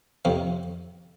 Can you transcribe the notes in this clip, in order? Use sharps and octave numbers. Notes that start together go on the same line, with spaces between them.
F2 C3 F3